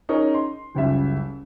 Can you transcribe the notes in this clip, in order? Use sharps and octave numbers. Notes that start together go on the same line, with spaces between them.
C#4 D#4 G#4 A#4 C#5
C6
F#1 C#2 G3 E5